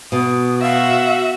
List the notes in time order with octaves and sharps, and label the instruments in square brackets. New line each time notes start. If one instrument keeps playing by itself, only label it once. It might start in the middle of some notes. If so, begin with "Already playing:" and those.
[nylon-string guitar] B2 [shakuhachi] D#6
[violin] F#4 [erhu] E5 [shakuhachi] F5